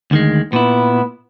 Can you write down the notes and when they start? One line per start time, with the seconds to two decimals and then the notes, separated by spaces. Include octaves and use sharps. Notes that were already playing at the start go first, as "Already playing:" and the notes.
0.11 D2 D#3 G#3
0.53 A#2 B3 E4